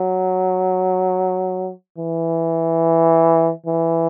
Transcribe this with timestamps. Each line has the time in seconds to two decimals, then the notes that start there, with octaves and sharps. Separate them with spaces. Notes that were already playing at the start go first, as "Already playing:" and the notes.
Already playing: F#3
1.98 E3
3.67 E3